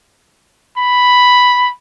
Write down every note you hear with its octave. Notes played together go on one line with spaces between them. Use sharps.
B5